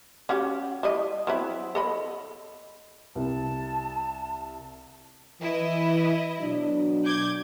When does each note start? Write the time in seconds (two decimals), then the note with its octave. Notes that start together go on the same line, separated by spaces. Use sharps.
0.29 C#4 F#4 G4
0.83 G3 E4 D#5
1.27 F#3 C4 E4
1.75 A4 D#5 B5
3.15 C2 A5
5.41 E3 E4 D#5
6.40 B2 F#3 D4
7.04 D6 G6 G#6